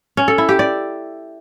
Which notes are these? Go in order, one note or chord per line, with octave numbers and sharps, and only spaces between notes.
C#4
A4
E4
G4
D5